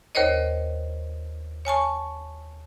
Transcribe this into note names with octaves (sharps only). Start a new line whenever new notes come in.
D#2 A#4 C5 C#5 D#5
C#5 G#5 A5 C#6